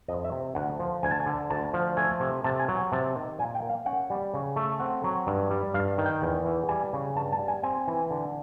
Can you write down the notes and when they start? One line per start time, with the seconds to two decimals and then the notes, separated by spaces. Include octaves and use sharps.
0.08 F2 D#5
0.24 E5
0.31 C3
0.55 D2 F#5
0.80 F3
1.03 D2 G#5
1.11 A5
1.20 G#5
1.26 D3
1.50 D2 A5
1.74 F3
1.97 A3 G#5
2.20 C3
2.44 C3 A5
2.59 G#5
2.68 F#3
2.76 G#5
2.92 C3 A5
3.16 D#3
3.39 A#2 G#5
3.55 G5
3.62 A#3
3.70 F5
3.86 C#4 F#5
4.10 G3
4.34 C#3
4.56 A3
4.80 C4 F#5
5.04 F#3
5.27 G2
5.51 G3
5.74 G2 F5
5.98 D#3
6.06 G5
6.22 E2
6.45 E3
6.69 G3 G#5
6.93 C#3
7.16 G2 A5
7.32 A5
7.39 G3
7.48 G#5
7.63 C4 G#5
7.88 E3
8.11 D3